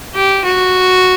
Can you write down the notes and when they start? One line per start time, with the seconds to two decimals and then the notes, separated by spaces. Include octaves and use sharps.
0.15 G4
0.45 F#4